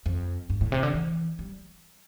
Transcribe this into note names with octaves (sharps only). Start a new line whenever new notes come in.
F2
G2
A2
C3
D3
E3
G3